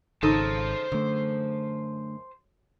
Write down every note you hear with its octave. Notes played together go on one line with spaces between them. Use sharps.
G#1 C#3 D#4 A4 C5 A5
F#2 D3 A3